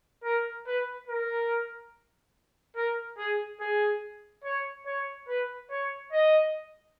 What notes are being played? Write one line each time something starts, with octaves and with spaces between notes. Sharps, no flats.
A#4
B4
A#4
A#4
G#4
G#4
C#5
C#5
B4
C#5
D#5